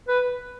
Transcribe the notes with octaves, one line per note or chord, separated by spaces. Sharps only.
B4